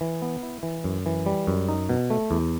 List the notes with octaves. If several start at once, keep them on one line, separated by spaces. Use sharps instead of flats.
E3
B3
E4
E3
F#2
E3
G3
F#2
D#4
B2
A3
E2